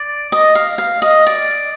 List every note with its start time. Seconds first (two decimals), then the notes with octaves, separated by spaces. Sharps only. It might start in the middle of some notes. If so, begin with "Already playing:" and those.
Already playing: D5
0.32 D#5
0.55 F5
0.78 F5
1.02 D#5
1.27 D5